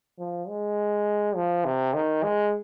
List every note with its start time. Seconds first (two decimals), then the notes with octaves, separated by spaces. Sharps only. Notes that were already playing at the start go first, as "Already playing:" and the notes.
0.19 F3
0.49 G#3
1.36 F3
1.65 C3
1.94 D#3
2.23 G#3